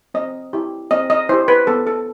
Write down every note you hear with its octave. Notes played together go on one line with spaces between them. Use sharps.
C4 D#5
E4 G4
C4 D#5
D#5
E4 G4 C5
B4
B3 A4
A4